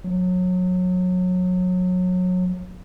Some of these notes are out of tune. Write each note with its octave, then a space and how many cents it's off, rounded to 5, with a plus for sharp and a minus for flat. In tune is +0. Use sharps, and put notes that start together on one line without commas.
F#3 -25